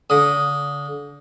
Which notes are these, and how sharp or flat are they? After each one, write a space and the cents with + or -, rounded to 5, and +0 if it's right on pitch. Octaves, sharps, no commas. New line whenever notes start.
D3 -35 D#6 +0